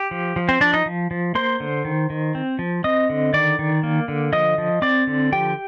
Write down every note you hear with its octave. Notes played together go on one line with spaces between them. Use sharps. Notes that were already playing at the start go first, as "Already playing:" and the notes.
Already playing: G4
F3
F3
C4 C5
F3 D4 D5
D#4 D#5
F3
F3
A#3 C5 C6
D3
D#3
D#3
C4
F3
C4 D#5 D#6
D3
D#3 D5 D6
D#3
A#3
D3
F3 D#5 D#6
F3
C4 D5 D6
D3
F3 G4 G5